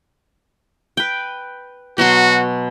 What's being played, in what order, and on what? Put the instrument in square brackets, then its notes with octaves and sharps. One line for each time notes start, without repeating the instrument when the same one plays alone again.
[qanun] B4 G5
[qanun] B2 F#3 C6 [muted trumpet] F#4